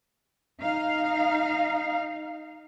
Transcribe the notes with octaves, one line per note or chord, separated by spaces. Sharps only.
D#4 F5